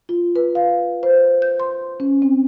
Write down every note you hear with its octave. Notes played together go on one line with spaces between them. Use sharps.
F4
B4
F5
C5
G6
C6
C#4
C4